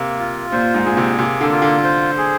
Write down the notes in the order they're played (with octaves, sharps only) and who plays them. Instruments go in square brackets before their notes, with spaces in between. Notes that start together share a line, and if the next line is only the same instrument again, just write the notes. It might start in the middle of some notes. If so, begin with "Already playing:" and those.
Already playing: [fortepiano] C3 [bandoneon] A#3
[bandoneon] F4
[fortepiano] A#2 [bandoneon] C5
[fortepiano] G#2
[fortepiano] A#2 [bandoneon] G#4
[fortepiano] C3
[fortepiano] C3 [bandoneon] A#3
[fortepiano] D3
[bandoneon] F4
[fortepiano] D3
[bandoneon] C5
G#4